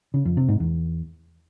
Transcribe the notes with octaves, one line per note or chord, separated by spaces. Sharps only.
C#3
F2
C3
G#2
E2